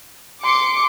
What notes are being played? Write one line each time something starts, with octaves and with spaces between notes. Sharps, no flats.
C6 D6 C#7